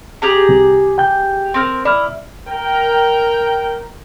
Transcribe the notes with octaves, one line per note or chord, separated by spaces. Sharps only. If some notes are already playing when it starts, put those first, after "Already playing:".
G4 G#4 A#5
C2
G5 G6
C4 A#4
E4 D5 F6
A#4 G5